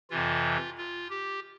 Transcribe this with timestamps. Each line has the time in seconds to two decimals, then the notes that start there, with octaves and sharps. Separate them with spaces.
0.10 F2 C3 E3 F4
0.78 F4
1.10 G4